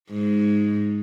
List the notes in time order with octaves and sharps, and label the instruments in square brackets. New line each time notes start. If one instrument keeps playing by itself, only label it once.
[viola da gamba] G#2